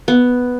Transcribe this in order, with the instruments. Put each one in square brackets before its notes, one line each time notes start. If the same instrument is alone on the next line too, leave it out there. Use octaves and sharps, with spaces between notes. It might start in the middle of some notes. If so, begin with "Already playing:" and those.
[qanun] B3